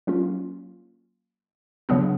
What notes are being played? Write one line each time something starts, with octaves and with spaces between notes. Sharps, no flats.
F#3 A#3 C#4 F4
C#3 F#3 B3 D4